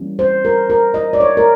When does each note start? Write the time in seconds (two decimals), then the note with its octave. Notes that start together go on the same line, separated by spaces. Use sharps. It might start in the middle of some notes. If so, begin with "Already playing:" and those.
Already playing: E3 G3 A#3 C#4
0.19 C5
0.45 A#4
0.70 A#4
0.94 D#5
1.13 D5
1.20 C#5
1.37 A#4